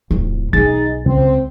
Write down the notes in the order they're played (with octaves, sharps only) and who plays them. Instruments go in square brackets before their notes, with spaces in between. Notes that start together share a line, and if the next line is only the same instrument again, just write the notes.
[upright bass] D1 F2
[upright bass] B1 C#4 [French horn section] D#4 G#4 [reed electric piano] A6
[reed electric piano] C#2 [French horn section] C4